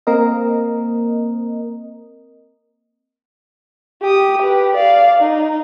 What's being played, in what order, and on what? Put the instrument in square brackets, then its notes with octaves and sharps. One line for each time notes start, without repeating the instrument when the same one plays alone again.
[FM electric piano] A#3 C4 A#4 D#5
[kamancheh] G4 D#6
G4 B4
D5 F5
D#4